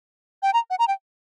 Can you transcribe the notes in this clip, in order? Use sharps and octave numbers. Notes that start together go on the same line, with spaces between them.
G5
A#5
F#5
A#5
G5